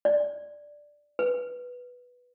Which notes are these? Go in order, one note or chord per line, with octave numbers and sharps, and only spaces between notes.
D5
B4